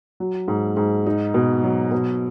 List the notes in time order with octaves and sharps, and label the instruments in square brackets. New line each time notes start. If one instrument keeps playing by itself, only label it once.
[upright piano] F#3
G#2
G#2
D#4
B2
F#3
B2